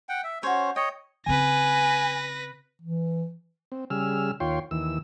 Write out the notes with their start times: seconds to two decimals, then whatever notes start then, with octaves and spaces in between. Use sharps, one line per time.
0.09 F#5 G5
0.24 E5
0.43 C#4 F#4 C5 C#5
0.76 C#5 D#5 G5
1.26 C#3 C4 B4 G#5 A#6
2.82 E3
3.72 C4
3.90 C#3 G3 G#4 E6 F6
4.40 D#2 F4 C#5 G5 C6
4.71 D#2 E3 E6